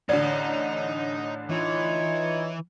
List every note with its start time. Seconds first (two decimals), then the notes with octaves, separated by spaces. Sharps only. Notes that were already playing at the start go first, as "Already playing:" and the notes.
0.09 A1 D3 D#4 D5 D#5
1.51 E3 D#4 F4 C#5